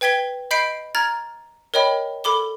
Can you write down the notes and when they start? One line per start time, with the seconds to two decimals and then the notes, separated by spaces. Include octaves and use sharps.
0.01 B4 G5 G#6 B6 G7
0.51 D#5 B5 G6 B6 C7 D7
0.95 A#5 F6 G#6 A6
1.74 A#4 C#5 D#5 G5 B5
2.24 A4 B5 D6 G7